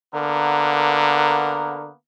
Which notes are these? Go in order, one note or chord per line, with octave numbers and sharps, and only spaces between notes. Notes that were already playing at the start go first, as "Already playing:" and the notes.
D3 A#3 B3 A#4